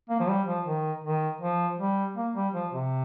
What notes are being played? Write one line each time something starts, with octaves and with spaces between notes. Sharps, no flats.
A#3
F3
G3
F3
D#3
D#3
F3
G3
A#3
G3
F3
C3